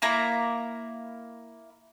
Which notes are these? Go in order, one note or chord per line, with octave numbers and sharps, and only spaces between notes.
A#3 E4 A#5